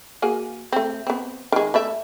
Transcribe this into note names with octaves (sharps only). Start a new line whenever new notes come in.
A#3 F#4 G#4
A3 C4
B3 C4
D#3 G#3
A3 D5 E5